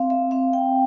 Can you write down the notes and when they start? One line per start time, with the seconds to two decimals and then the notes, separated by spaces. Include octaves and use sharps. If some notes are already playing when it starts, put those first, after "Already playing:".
Already playing: C4 F5
0.10 E5
0.31 C4 F5
0.53 G5